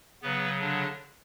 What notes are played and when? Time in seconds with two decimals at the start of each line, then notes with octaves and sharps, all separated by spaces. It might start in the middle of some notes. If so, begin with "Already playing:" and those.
0.22 C#3 F#3 B3 B4
0.61 D3 D4